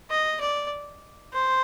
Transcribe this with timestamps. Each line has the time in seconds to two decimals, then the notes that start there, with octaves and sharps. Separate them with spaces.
0.10 D#5
0.40 D5
1.33 C5